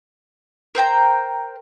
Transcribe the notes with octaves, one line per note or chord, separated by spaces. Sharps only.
A#4 C5 G5 A#5